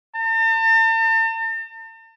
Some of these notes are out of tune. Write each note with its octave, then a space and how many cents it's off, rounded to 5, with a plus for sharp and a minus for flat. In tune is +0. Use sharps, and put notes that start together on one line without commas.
A5 +45